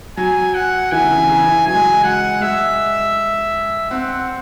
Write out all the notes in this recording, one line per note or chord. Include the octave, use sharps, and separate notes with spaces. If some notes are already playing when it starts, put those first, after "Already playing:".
F#3 G#5
F#5
E3 G#5
C#3
C#3
C#3
E3
F#3 G#5
G#3
F#3
F#5
G#3 E5
C4 F#5